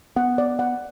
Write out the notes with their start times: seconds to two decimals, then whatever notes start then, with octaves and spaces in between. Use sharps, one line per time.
0.16 B3 F#5
0.38 D5
0.59 F#5